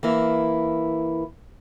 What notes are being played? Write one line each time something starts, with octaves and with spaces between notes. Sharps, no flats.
E3 A#3 E4